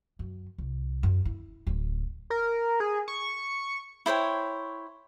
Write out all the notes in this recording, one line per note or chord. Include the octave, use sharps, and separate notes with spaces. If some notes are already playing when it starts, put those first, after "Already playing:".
F#2
C2
F#2
E4
D1
A#4
G#4
C#6
E4 C5 C#5 G5